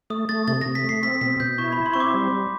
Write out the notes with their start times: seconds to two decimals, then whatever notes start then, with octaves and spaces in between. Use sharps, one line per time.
0.10 A3 D#6
0.29 A3 A6
0.48 C3 A6
0.61 C3 A#6
0.75 B6
0.84 A3 C7
1.03 C4 B6
1.21 B2 B6
1.40 B2 G6
1.58 E4 C#6
1.72 E4 B5
1.86 C6
1.94 C4 C#6
2.00 D6
2.14 G3
2.32 G3